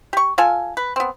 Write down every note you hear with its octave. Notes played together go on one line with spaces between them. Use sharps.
G4 C#6
F4 A4 F5 G#5
B4
B3 C4